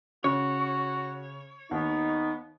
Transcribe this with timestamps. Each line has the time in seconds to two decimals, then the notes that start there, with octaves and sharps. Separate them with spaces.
0.24 C#3 F#4 C#5
1.71 D#2 B3 D#4